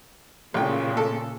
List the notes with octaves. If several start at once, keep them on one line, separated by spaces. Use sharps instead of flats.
A1 A#2 C#3 G5
A4